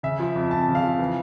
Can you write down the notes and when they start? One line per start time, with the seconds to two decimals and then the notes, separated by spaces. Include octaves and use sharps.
0.03 C#3 E5
0.20 F3
0.36 F2
0.51 F2 A5
0.68 C#3
0.75 F5
0.84 F3
0.99 E3